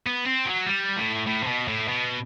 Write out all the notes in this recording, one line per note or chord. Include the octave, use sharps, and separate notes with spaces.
B3
C4
F#3
G3
A2
A2
C3
B2
A2
B2